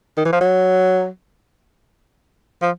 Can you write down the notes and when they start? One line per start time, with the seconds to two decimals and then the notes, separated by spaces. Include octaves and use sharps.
0.17 D#3
0.25 E3
0.32 F3
0.41 F#3
2.62 F3